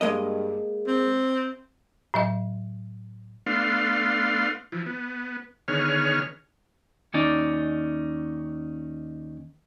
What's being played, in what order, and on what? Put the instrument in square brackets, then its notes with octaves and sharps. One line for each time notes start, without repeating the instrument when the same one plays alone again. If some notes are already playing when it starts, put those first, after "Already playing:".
[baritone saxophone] G2 [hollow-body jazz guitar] G#3 A#3 D#5
[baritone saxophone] C4
[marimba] A2 F#3 D#5
[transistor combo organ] A3 B3 D4 F5 C6
E3 F3
B3
D3 D#3 B3 G#4 C#5 F6
[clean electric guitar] D#2 C#4 D#4 D5